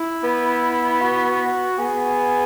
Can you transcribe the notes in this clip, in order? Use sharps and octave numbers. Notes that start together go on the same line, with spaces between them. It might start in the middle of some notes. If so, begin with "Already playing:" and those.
Already playing: E4
B3
F#4
B3 G#4